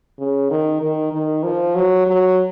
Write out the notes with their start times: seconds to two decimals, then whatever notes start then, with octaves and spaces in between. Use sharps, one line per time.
0.19 C#3
0.50 D#3
0.82 D#3
1.12 D#3
1.43 F3
1.75 F#3
2.06 F#3